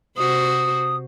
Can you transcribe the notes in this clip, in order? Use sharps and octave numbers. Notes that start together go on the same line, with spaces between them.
C3 F#4 C5 D#6